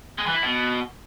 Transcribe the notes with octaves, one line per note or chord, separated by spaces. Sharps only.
G#3
E3
E4
B2